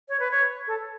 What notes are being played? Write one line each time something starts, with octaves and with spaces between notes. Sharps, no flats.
C#5
B4
C#5
A4